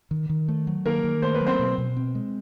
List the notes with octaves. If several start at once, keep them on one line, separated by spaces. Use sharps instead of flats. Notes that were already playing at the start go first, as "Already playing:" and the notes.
D#3
D#3
A3
F#3
D#3 A#3 A#4
D#3
A3 C5
B4
F#3
C4 C5
B2
B2
C4
G#3